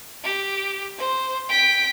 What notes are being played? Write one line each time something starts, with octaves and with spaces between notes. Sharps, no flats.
G4
C5
G5 B6